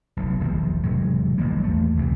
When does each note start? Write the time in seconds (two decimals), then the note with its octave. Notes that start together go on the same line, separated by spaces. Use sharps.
0.17 F1 B1
0.40 E1 A#1 D#3 F3
0.83 E1 G#2 C3 F#3
1.38 A1 D#3 G3 A#3
1.64 E2 A3
1.97 C#2 C3 E3